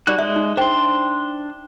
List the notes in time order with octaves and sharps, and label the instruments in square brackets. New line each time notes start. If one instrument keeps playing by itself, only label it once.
[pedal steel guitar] G3 F#4 F#6 [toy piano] D#4 D5
[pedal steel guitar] G#3 [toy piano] E5
[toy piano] D#4
[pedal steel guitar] D4 C6 [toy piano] C5 G5